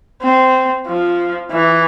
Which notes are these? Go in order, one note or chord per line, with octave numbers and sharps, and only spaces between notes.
C4
F3
E3